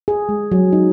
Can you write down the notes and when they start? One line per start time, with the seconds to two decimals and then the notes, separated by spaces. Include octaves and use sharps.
0.08 G#4
0.29 G#3
0.52 F#3
0.73 D#4